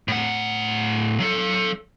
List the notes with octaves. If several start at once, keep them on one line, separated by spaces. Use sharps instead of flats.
A2 F#5
F#3 A4